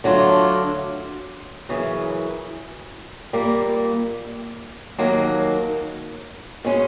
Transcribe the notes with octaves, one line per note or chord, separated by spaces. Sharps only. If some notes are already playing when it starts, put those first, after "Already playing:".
D3 F#3 A3 D4 F4
F#2 C#3 E3
A#2 G3 A#3
D#2 D#3 F#3 A#3
B2 G#3 C#4